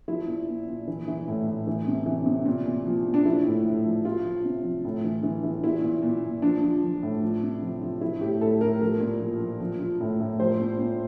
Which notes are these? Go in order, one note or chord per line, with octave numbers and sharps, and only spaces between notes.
F3 E4
A#2
A#2
A#2
E3
E3
A2
A2
E3
C3
E3
C3
A#2
A#2
F3
A#2
D4
F3 E4
A2
A2
F3
F3 F4
F3
C3
F3
A2
E3
E3
E3
A#2 E4
A#2
A#2
A#2
F3 D4
F3
F3
A2
F3
C3
F3
F3
F3 E4
A2 G4
A2 A4
A2 A#4
F3 A#4
A#2
F3
F3
F3
F3
A2
A2
F3 C5
A#2
A#2